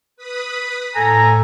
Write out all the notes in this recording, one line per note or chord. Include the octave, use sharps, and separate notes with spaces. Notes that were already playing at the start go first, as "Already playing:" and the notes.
B4 B5 D#6
A2 A3 A4 G#5 A#5